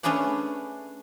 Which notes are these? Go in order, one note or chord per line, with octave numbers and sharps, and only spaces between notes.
A3 C#4 D4 G#4 B4 D5